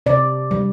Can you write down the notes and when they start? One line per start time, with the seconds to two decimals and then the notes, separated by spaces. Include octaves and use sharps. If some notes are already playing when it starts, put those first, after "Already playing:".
0.06 C3 D5
0.51 G3